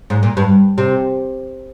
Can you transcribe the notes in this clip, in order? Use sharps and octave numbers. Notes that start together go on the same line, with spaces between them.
G#2
A#2
G2
C3